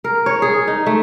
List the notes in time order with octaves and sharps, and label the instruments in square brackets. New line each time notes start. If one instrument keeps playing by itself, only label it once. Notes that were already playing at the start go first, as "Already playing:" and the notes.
[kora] A#4
C#5
G#4
D#4
A3